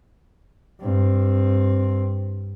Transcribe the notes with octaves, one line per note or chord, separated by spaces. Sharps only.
G2 C4